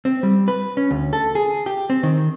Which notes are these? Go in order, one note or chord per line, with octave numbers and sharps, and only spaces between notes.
C4
G3
B4
C#4
D2
A4
G#4
G4
C4
D#3